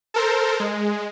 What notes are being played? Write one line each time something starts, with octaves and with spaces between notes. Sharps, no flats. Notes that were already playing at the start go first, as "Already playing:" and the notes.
A4 A#4 C5
G#3